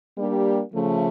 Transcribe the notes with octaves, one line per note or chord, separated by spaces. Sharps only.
G3 A#3 D4 G4
C#3 F3 A3